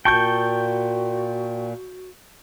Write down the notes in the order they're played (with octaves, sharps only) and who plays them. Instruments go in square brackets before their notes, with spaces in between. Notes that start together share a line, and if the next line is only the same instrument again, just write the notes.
[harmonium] A#2 [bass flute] F#4 [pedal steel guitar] G5 C#6 [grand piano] A5 G6